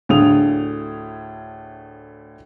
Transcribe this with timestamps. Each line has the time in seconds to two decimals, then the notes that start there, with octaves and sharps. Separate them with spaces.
0.09 D2 A2 G#4 F5 D#6 F7